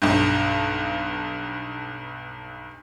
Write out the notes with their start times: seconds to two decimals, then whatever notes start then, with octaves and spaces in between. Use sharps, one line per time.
0.02 B1 G2